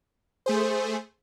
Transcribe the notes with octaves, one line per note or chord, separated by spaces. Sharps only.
A3 G#4 C5